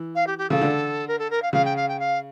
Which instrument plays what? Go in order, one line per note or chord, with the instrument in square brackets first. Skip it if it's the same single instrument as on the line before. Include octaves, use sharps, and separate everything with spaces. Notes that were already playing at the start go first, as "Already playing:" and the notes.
Already playing: [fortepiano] E3
[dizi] F5
G4
G4
[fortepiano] C#3 [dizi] A4
[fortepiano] D3
[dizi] A#4
A4
A#4
F5
[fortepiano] C#3 [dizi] F5
[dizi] G5
F5
G5
F5